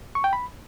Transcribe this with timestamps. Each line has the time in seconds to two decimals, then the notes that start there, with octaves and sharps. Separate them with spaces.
0.15 C#6
0.24 G5
0.33 B5